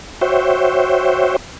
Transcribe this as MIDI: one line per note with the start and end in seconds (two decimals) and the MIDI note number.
0.21 1.37 66
0.21 1.37 72
0.21 1.37 73
0.21 1.37 76
0.21 1.37 79